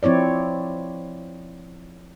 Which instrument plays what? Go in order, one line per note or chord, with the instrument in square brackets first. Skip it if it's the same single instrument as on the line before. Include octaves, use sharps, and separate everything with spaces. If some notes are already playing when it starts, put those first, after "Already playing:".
[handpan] F3 C4 E4 C#5 D5